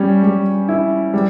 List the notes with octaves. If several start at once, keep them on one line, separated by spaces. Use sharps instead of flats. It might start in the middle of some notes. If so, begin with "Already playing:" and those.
Already playing: G3 C#4
G3
E4
G3